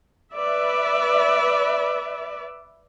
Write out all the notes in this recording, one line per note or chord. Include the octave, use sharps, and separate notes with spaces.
B4 D5 E5